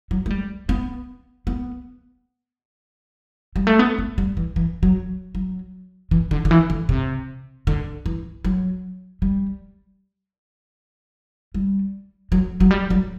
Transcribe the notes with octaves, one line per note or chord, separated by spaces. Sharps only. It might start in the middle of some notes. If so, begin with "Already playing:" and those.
F#3
A3
G3
B3
B3
G3
A3
B3
A3
G3
E3
E3
F#3
F#3
E3
D3
D3
E3
D3
C3
D3
E3
F#3
G3
G3
F#3
F#3
G3
F#3